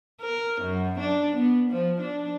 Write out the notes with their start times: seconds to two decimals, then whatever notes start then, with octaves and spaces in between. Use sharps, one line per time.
0.21 A#4
0.61 F#2
1.00 D4
1.36 B3
1.70 F3
2.01 D4